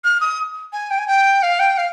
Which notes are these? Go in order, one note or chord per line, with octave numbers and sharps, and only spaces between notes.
F6
D#6
G#5
G5
G#5
G5
F5
G5
F5